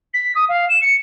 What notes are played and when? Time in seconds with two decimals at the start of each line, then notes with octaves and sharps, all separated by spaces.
0.14 B6
0.35 D#6
0.48 F5
0.69 E7
0.81 C#7